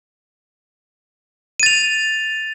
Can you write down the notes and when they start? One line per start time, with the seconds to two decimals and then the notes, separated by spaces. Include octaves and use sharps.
1.60 D#7
1.63 A6
1.66 F7